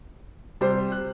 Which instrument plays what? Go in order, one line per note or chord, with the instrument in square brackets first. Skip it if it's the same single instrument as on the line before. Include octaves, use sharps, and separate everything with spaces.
[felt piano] C3 C5 [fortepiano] G3
[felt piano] F#6